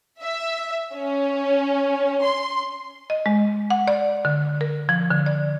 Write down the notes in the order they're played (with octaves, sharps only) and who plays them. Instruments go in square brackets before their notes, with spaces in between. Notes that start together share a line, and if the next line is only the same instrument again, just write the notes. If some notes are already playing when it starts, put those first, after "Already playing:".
[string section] E5
C#4
C6
[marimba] D#5
G#3
F#5
D5
D3
A#4
F3
D3
D5